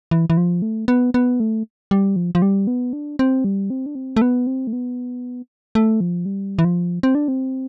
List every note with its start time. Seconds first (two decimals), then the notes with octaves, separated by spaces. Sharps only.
0.11 E3
0.30 E3
0.37 F3
0.62 A3
0.88 B3
1.14 B3
1.40 A3
1.91 G3
2.16 F3
2.35 F3
2.42 G3
2.67 B3
2.93 D4
3.19 C4
3.44 G3
3.70 C4
3.86 D4
3.95 C4
4.16 A3
4.22 B3
4.47 C4
4.67 A3
4.73 B3
5.75 A3
6.01 F3
6.26 G3
6.59 E3
6.65 F3
7.03 C4
7.15 D4
7.28 C4